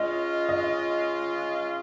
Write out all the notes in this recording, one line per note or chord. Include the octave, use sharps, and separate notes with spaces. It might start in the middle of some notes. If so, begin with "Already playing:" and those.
Already playing: G#3 C#4 F4 D#5
D#5